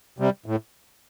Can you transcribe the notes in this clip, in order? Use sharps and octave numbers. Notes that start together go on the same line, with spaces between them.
C3 G3
A2